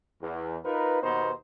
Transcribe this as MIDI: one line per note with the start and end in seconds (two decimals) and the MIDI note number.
0.22 0.58 40
0.65 1.02 63
0.65 1.02 65
0.65 1.02 70
0.65 1.02 71
1.03 1.32 39
1.03 1.32 47
1.03 1.32 59
1.03 1.32 63
1.03 1.32 72